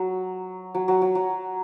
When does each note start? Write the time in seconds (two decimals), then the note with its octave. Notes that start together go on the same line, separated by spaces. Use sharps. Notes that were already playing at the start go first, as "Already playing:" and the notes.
Already playing: F#3
0.75 F#3
0.88 F#3
1.02 F#3
1.15 F#3